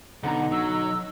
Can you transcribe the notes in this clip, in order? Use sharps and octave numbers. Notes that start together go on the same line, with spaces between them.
B1 D3 B3 D#4 F#5 A#5
F#3 E6